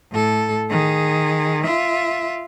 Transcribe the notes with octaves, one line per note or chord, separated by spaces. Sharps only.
A2 A4
D#3 G#4
F4 E5